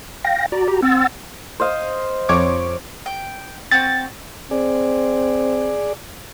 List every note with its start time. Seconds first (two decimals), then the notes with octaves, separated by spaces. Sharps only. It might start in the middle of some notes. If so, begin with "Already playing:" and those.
0.24 F5 G5 A#6
0.52 F#4 D5 A#5
0.68 G4
0.82 C4 F#5 E6 A6
1.60 C5 D#5 F5
2.29 F2 C#5 D6
3.06 G5
3.71 C4 F#4 A6
4.51 C4 G#4 D5